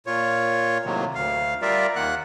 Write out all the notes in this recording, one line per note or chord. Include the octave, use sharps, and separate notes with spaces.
A#2 F4 C#5
A2 C3 D#3 F#3 A#3
D2 F5
G3 F4 A#4 D5 E5
D#2 D#3 A#3 F#5 F#6